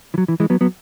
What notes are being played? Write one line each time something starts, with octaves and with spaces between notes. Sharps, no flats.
E3
F#3
E3
E3 G#3
F#3 B3
F#3 B3